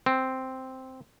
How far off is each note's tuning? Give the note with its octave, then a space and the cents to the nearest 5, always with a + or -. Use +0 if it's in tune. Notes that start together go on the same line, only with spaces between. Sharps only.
C4 -5